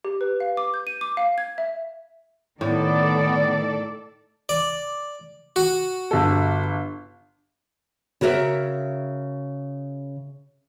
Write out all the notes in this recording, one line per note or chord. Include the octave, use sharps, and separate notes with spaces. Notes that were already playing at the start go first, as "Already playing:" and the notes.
G4
B4
F5
D6
G6
D#7
D6
F5
G#6
E5
A2 D#3 B3 A4 D5
D5
F#4
G1 A4
C#3 F#4 A#4 D5 E5